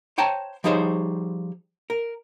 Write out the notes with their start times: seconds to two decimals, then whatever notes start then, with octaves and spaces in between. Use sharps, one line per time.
0.18 C5 C#5 G5 A5 A#5
0.64 F3 G3 D#4 G#4 C5 C#5
1.90 A#4